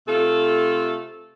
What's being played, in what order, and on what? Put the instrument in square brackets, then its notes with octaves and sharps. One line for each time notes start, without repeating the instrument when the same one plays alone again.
[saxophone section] C3 A3 F4 A4